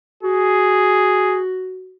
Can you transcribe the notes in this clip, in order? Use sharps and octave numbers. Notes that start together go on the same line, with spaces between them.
F#4 G#4